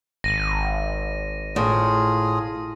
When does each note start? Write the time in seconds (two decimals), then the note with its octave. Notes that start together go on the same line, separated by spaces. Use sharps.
0.24 G#1 A#6 D#7
1.56 A2 F4 G#4